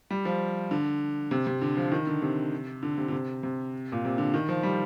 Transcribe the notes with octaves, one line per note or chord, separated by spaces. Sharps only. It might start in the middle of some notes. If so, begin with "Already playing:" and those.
G3
F3
D3
C3
C3
D3
F3
D#3
D3
C3
D3
C3
D3
C3
C3
A#2
C3
D3
D#3
F3
G3